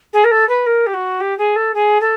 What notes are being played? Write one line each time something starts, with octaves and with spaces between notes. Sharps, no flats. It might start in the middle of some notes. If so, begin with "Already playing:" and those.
G#4
A#4
A4
B4
A#4
G4
F#4
G4
G#4
A4
G#4
A4